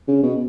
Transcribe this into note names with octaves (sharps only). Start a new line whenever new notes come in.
C#3
B2